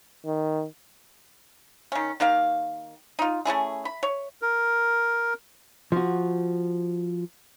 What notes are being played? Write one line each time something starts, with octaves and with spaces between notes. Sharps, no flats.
D#3
D#3 C#4
D#3 A#3 G4 F5
D#4 F4
A3 C#4 E4 G#4
B5
C#5
A#4
F3 F#4